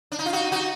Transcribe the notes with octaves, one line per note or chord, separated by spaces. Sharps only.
D4
D#4
F4
D#4 F#4
D#4 F#4